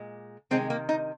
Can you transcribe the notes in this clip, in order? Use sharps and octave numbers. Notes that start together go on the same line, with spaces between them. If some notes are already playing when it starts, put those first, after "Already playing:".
Already playing: A#2 G#3
C3 D#3 G#3 C4
A#3
D#4